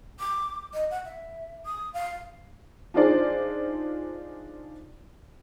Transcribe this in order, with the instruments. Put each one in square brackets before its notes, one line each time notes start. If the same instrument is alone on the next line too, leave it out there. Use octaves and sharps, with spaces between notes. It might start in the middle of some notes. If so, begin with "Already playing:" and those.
[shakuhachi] D6
D#5
F#5
E5
D#6
F5
[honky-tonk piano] D4 D#4 F4 G#4 C5 D5